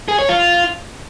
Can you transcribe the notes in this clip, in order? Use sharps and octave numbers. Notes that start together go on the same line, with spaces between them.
G#4
C#5
F4